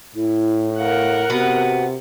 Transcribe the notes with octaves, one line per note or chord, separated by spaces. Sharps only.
A2 E4
A#4 F5 F#5
C3 B3 F#4